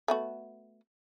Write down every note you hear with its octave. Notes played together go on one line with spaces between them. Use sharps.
A3 B3 F#4